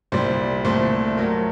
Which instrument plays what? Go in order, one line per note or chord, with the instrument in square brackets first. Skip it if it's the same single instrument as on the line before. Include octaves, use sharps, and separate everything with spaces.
[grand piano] C2 A#2 G3 C5
C2 A#2 A3 C4
G2 F#3 A3 A#4